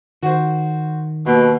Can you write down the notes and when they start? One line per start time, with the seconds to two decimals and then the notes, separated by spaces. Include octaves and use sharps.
0.23 D#3 F#4 C5
1.26 D#2 B2